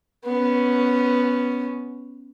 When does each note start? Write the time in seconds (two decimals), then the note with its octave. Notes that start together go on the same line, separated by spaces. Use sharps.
0.25 B3 C#4